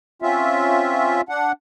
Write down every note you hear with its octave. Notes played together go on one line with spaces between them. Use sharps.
C4 C#4 F4 E5
D4 F#5